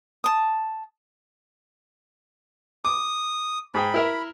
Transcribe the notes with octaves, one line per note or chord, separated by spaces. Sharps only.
A5 D#6
D6 D#6
G#2 G#4 G5 B5
E4 A#4 E5